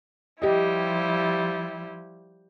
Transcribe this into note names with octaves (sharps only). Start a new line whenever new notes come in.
F3 G3 E4 G4 D#5